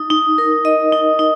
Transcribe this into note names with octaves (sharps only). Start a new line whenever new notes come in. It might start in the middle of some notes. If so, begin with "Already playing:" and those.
Already playing: D#4
D#4
A#4
D#5
D#4
D#4